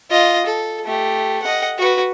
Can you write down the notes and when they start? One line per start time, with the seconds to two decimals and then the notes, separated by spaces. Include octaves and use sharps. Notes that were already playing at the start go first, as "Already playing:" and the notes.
0.10 F4 D#5
0.46 A4
0.85 A3 G4
1.42 D#5 F#5
1.78 F#4 B4